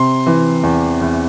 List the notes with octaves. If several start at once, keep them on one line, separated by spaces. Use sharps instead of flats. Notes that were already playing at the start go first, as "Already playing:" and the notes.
Already playing: C3 C6
E3
E2
E2